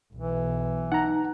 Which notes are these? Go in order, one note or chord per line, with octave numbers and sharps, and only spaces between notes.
B1 E3
D#4 F#5 A#5